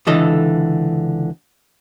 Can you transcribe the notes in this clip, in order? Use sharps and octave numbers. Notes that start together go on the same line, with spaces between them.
C#2 D3 E3 A4 D#5